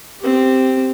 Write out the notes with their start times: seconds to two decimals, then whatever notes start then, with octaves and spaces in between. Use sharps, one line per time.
0.19 C4 G4